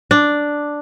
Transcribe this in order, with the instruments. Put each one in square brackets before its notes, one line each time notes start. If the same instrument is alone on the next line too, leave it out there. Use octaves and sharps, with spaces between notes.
[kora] D4